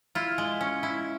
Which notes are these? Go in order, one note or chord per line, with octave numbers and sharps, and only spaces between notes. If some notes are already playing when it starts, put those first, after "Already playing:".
E4 F4
G#3
C#4
E4